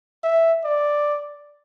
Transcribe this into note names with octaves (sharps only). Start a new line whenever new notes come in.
E5
D5